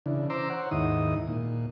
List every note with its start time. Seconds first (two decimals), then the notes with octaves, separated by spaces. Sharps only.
0.06 C#3 E3 D4
0.30 C5 A#5 C6 D6 E6
0.50 C5 C#5 F#5
0.71 D#2 G#2 D#3 D#4 E4 D#6
1.28 A#2